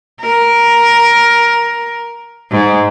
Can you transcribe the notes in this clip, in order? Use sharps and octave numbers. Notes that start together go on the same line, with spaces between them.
A#4
G#2